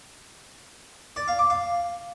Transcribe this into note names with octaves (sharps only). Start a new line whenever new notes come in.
D5
F5
D6
F5